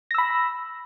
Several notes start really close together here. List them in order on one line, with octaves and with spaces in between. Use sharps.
A#6 E6 B5